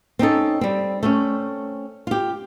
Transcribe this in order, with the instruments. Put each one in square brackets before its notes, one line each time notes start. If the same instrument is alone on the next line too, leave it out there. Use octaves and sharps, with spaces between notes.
[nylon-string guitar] C4 C#4 D#4 A4
G3 C4
A3 C4 C#4
F4 G4